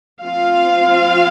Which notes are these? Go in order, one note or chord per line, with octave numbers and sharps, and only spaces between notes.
F3 C4 F4 F5